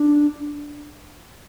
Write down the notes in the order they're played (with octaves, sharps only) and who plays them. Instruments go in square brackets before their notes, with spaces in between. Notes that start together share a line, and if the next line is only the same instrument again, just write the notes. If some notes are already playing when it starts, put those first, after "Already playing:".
Already playing: [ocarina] D4